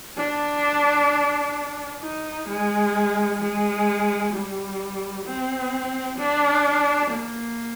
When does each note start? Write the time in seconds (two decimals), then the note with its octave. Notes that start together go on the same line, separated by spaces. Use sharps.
0.17 D4
2.02 D#4
2.48 G#3
3.41 G#3
4.33 G3
5.25 C4
6.18 D4
7.11 A#3